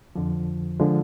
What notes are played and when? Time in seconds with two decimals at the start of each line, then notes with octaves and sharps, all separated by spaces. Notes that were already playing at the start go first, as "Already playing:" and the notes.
0.16 F2 D3 F3
0.80 D3 F3 G#3